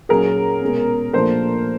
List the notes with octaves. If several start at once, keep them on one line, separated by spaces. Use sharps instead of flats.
A#2 F#3 A#3 C#4 G#4 A#4
B2 G#3 C#4
A#2 F3 A3 D4 A#4 C5